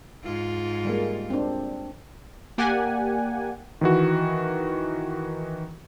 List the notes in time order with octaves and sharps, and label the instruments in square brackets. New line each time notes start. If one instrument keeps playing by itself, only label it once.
[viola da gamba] G#2 F4
[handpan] G3 G#3 A#3
C4 D4
[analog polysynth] A#3 G4 D5 F#5 G#5
[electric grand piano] D#3 E3 F#4